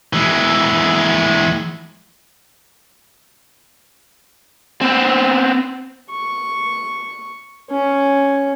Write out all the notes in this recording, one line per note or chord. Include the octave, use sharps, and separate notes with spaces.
E3 G#3
B3 C4
C#6
C#4